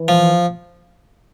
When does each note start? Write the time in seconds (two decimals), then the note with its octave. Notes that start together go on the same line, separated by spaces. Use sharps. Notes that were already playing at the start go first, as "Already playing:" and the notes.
Already playing: E3
0.08 F3